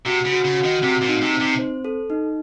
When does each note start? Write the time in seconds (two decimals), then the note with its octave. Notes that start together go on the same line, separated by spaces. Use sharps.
0.06 C3 F#4
0.25 C#3
0.32 F#4
0.45 C#3
0.58 F#4
0.64 D#3
0.83 C3 C4
1.01 A#2
1.08 D#4
1.21 C3
1.34 C4
1.40 C3
1.59 C5
1.85 A4
2.10 D#4